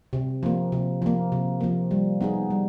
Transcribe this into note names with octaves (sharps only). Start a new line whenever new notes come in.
C3
F3 A#3
C3
F3 A#3
C3
F3 A#3
G3
B3 D#4 G#4
G3